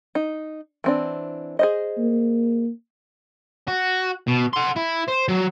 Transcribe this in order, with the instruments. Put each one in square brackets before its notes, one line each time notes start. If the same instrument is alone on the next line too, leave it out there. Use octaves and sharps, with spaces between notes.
[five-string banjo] D#4
E3 C4 D4
G#4 C5 D#5
[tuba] A#3
[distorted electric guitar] F#4
B2
F#5 C6
E4
C5
F#3